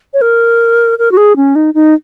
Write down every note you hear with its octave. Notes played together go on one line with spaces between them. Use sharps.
C#5
A#4
A#4
F#4
G#4
C#4
D#4
D#4